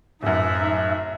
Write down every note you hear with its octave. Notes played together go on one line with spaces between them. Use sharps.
D1 F#2 D#4 E5